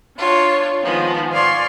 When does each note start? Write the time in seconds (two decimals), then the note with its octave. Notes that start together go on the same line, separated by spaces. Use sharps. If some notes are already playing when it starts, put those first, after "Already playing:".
0.17 D4 F4 C#5
0.81 D#3 F3 G#3 B3
1.32 D5 F5 G#5 C6 C#6